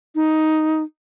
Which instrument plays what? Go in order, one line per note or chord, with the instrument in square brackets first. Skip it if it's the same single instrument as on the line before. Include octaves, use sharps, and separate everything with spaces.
[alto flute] D#4